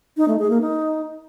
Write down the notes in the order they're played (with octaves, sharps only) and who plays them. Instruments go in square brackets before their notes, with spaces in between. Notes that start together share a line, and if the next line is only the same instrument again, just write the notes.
[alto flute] D#4
A3
G#4
A#3
D#4